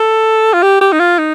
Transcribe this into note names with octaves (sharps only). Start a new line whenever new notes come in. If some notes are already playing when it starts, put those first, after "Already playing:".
Already playing: A4
F4
G4
G4
D#4
F4
D#4